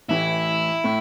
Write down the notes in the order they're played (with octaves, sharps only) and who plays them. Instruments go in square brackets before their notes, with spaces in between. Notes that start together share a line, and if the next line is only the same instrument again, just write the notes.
[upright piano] A1 A2 E3 [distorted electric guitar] E4
[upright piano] A2